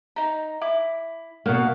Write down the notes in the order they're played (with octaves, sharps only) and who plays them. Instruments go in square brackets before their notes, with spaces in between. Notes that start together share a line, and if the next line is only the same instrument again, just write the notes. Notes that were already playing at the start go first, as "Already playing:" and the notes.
[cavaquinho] D#4 A#5
E4 D6
[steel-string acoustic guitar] B2 A#3 [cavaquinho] F5 F#5